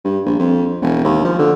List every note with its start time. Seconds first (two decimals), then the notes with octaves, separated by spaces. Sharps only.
0.05 G2
0.26 A#1
0.39 F2
0.82 E1
1.05 D#2
1.24 F3
1.39 D3